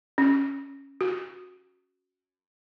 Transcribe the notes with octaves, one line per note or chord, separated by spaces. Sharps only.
C#4
F#4